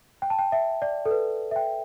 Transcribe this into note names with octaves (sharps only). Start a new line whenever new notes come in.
G5
A5
G5
E5
D5
A4
B4
E5
G5